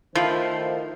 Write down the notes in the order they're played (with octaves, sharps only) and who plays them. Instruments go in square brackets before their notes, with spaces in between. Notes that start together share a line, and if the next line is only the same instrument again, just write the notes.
[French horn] D#3 [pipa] F3 [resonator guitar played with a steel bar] A3 E4 F4 [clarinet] C5